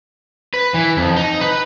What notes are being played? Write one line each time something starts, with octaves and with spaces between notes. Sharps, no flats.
B4
E3
F2
D#4
B4